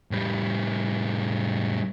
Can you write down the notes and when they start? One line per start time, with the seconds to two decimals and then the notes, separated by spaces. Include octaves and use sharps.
0.11 A2 G3